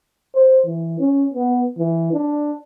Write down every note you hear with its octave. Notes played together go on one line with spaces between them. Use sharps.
C5
E3
C#4
B3
E3
D4